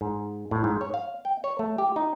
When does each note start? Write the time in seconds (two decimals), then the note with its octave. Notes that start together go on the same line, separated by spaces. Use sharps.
0.01 G#2
0.51 A2
0.64 G#2
0.81 C#5
0.94 F5
1.25 G5
1.44 C#5
1.59 A3
1.78 G4
1.96 D#4